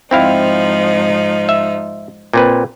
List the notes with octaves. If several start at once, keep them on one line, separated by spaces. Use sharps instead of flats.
G#2 F3 C4 D#4 E4 F5
E5
A#2 C4 B4